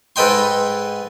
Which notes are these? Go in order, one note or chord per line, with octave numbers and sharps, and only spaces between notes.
G#2 A4 B4 D#5 G5 C6